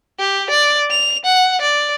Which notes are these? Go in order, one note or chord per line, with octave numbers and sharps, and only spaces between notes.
G4
D5
F7
F#5
D5